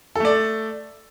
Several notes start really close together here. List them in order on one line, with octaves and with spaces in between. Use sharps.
A4 A3 D5